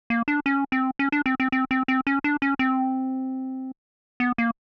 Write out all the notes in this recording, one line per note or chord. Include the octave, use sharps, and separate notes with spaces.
A#3
D4
C#4
C4
C#4
D4
C4
C4
C4
C4
C4
C#4
D4
C#4
C4
B3
A#3